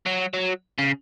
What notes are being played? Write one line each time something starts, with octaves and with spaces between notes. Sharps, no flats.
F#3
F#3
C#3